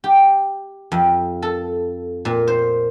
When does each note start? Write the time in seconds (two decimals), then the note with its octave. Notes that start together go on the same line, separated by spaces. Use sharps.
0.04 G4
0.92 F2
1.42 A4
2.25 A#2
2.48 C5